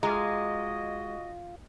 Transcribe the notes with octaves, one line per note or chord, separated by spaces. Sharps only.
G#3 F4 F#4 D#5 A#5 D6